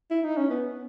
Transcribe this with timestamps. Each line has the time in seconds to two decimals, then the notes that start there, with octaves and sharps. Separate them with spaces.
0.11 E4
0.24 D#4
0.37 C#4
0.50 B3